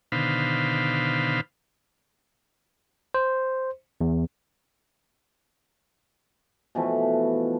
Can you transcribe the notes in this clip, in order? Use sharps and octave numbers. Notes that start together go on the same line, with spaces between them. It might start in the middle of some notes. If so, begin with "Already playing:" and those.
B2 D3 D#3 C5 F5 B5
C5
E2
B2 E3 F3 A3